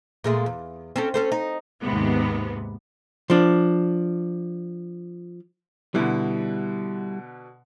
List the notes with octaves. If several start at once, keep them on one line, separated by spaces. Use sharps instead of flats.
A#2 G#3 A3
E2
C4 C#4 A4
C#4 A4 C5
D#4
D#2 G#2 C3 B3
F3 D4
B2 D3 G3 E4